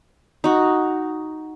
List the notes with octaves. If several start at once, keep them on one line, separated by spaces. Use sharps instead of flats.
D#4 F#4